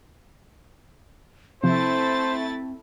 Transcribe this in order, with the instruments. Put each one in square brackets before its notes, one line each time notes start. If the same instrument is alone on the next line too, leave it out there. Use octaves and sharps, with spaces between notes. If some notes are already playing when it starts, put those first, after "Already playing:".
[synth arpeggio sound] C3 F3 [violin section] A3 E4 A6 [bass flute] C4 [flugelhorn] C5